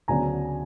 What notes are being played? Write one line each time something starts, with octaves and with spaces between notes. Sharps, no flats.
D2 C#3 F#3 B3 D4 G#5 A#5